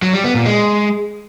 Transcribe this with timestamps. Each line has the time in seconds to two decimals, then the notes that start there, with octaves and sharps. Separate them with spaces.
0.02 F#3
0.13 G3
0.24 B3
0.35 A#2
0.46 G#3